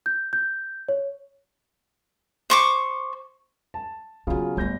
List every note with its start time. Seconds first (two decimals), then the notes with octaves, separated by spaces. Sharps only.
0.06 G6
0.33 G6
0.89 C#5
2.50 C5 C#6 D6
3.74 A5
4.27 C#3 F#3 A#3 B3 F4
4.57 G1 A3 C#4 G6 A#6